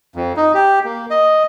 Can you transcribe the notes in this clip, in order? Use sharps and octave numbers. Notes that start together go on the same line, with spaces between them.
F2
D#4
G4
A#3
D#5